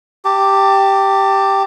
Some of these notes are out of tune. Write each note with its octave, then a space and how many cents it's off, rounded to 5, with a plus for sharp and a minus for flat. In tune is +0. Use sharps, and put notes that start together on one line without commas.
G4 +0 A5 +25